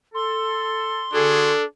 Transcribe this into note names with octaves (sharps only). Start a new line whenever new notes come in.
A4 C6
D3 D4 F#4 G#4 A4